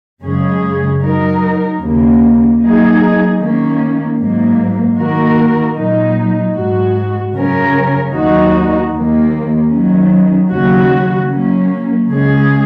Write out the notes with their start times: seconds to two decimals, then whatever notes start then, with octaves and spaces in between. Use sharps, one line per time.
0.23 F#2 C#3 G#3 C#4 G#4
1.03 F#3 D#4 A#4
1.81 D#2 C#3 A#3
2.61 F#3 A#3 D#4 G#4
3.39 D#3 A#3 C#4
4.19 G#2 F#3 A#3
4.98 D#3 A#3 F#4 A#4
5.76 A#2 F#3 D#4
6.55 G#2 G#3 F#4
7.34 C#3 F#3 C#4 A#4
8.13 D#2 D#3 F#3 D#4 F#4
8.92 D#2 D#3 A#3
9.71 D#3 F#3 C#4
10.51 D#2 C#3 F#3 C#4 F#4
11.29 F#3 A#3 C#4
12.08 C#3 G#3 C#4 G#4